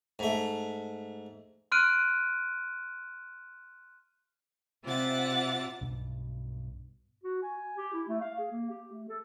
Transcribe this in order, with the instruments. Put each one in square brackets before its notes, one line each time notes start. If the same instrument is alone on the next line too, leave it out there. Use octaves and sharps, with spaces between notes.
[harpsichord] G#2 A3
[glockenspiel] C6 F6 F#6 D7 D#7
[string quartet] C3 F4 D5 E5 F#5 A6
[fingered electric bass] B1 G2 B2
[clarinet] F#4
G#5
G4
E4
A3
F5
G#4
A#3
G4
A3
A4